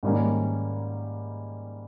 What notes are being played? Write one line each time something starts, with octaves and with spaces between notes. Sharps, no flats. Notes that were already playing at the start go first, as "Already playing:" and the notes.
G#2 D#3 G3 A#3 C#4